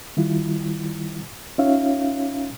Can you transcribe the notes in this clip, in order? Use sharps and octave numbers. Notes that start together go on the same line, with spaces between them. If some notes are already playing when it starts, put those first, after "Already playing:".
D#3 G3 E4 F4
C#4 D#4 F4 C#5 E5 F5